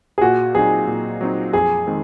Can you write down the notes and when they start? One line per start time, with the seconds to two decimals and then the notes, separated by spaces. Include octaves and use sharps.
0.18 G#4
0.21 A#2 F#4
0.55 F#3 C4 D#4 G#4
0.87 A#2
1.21 F#3 C4 D#4
1.53 F2 G#4
1.87 D#3 G#3 C4